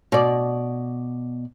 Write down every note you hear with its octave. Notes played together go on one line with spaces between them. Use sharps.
B2 D5